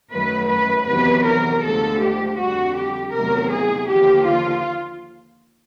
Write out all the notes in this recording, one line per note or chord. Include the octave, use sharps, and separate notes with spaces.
F#2 D#3 F#3 A3 B4
B4
E2 C3 D#3 F#3 B4
A#4
D2 D3 F3 G#3 A4
G4
F2 D3 G3 F#4
G4
E2 C3 D#3 F#3 A3 A#4
G#4
D#2 D3 F3 G4
F4